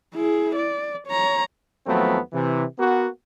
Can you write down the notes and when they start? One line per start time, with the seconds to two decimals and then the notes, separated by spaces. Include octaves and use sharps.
0.14 E4 G#4
0.55 D5
1.07 C#5 A#5
1.86 D#2 F3 F#3 A3 B3 C4
2.33 C3 E3
2.78 A#3 B3 F#4